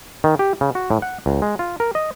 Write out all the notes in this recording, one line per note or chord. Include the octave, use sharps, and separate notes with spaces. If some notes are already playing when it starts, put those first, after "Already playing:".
D#3
G4
C#3
F#4
A2
F#5
C#2
G#3
F4
A#4
D#5